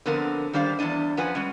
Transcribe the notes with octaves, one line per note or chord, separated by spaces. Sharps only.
D3 F3 B3 C4 D4 A#4
D#3 G3 D4 C5 F5
E2 F3 G3 D4 D#5
F#2 F3 B4 F#5 G#5
G3 G#3 C#4